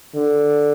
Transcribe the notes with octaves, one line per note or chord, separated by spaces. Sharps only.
D3